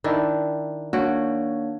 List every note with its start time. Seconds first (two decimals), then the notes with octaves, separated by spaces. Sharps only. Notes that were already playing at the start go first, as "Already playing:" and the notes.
0.04 D#3 D4 E4
0.93 A#3 D4 F#4 C#5